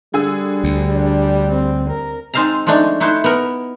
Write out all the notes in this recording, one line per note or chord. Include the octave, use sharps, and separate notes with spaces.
D3 G3 G#4 E6
D2
D4
C4
A#4
G#3 C4 D#4 F5 A5 A#5
F3 G#3 A3 D4 D#4
A3 D#4 E4 F#4 C5
B3 A#4